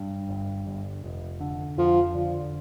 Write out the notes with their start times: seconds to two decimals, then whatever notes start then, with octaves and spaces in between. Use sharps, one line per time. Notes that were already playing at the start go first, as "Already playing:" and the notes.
Already playing: G2
0.29 G1
0.67 G1
1.04 F1
1.41 D3
1.78 F2 F3
2.15 D3